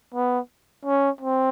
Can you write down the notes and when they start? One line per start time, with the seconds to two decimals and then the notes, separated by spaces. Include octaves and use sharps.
0.14 B3
0.85 C#4
1.21 C4